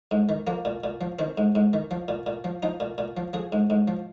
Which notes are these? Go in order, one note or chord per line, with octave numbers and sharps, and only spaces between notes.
G#2
D#3
F3 A#3
A#2
A#2
F3
D#3 C4
G#2
G#2
D#3
F3
A#2
A#2
F3
F3 D#4
A#2
A#2
F3
F3 G#4
G#2
G#2
F3